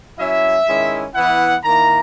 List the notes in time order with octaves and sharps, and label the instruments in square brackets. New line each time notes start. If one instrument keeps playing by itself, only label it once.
[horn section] F#3 C#4 E4 E5
D#3 G#3 C#4 E4
E3 B3 E4 F#5
D#3 A#3 E4 A#5